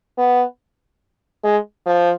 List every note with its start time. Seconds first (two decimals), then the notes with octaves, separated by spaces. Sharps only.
0.18 B3
1.44 G#3
1.87 F3